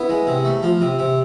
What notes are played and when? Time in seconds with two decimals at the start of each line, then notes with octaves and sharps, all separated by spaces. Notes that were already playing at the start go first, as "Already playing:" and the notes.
Already playing: B3 E4
0.09 G#3
0.27 C3
0.45 A3
0.63 F3
0.81 C3
0.99 C3